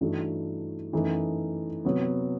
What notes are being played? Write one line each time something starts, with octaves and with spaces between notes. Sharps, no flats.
G2 E3 A3 D#4 F#4
F#2 E3 A3 D#4
C3 F#3 B3